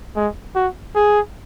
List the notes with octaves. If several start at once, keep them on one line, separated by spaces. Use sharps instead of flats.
G#3
F#4
G#4